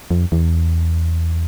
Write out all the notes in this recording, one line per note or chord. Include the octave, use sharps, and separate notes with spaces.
F2
E2